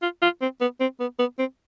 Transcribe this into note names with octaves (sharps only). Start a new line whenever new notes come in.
F4
F4
C4
B3
C4
B3
B3
C4